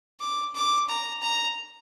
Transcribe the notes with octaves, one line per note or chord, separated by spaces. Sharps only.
D6
D6
A#5
A#5